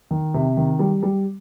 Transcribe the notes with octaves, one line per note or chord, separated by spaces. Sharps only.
D#3
C3
D#3
G3
G3